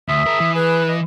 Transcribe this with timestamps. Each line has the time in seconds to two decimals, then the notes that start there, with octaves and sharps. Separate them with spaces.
0.09 D2 E5 D#6
0.27 G#4 A#4
0.40 E3
0.55 G#4 B4
0.89 D#5